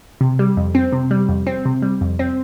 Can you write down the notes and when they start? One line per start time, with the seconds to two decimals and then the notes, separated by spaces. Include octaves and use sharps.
0.21 C3
0.39 G3
0.57 F2
0.75 C4
0.93 C3
1.11 G3
1.29 F2
1.47 C4
1.65 C3
1.82 G3
2.01 F2
2.19 C4